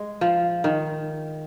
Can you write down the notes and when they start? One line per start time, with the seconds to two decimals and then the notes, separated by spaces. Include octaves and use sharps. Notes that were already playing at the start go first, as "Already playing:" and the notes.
Already playing: G#3
0.21 F3
0.64 D#3